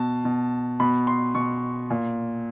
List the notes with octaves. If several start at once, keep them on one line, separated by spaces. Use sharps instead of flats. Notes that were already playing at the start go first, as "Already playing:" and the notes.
Already playing: B2 A5
B2
B2 B5
C6
B2 C#6
A#2